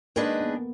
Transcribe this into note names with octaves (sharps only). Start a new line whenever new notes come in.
D#3 G#3 A#3 D4 G#4 B4
B3